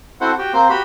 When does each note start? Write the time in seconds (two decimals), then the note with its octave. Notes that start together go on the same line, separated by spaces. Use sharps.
0.21 C4 E4 F#4 A4 C5 F#5
0.38 F#4 G4 G5
0.53 A#3 C4 C5
0.69 F#4 G4 B5